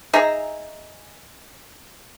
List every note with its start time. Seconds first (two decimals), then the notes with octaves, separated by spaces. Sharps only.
0.13 D#4 G#4 E5 A#5